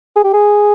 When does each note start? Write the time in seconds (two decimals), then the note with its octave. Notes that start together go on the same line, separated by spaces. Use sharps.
0.16 G#4
0.24 G4
0.33 G#4